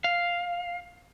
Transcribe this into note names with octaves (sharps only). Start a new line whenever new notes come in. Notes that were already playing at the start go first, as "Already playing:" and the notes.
F5